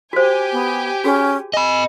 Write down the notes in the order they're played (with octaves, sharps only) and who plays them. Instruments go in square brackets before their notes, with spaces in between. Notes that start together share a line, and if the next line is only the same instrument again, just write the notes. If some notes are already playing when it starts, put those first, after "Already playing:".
[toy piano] F#4 C5 [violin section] G4 G#5
[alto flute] B3
[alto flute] C#4 [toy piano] F#4 G#4
[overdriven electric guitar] D#5 B5 [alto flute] G#5